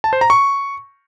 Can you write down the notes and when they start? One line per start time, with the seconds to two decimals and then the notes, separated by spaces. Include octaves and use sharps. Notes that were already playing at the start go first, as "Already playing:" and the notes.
0.04 A5
0.13 C5
0.21 A#5
0.30 C#6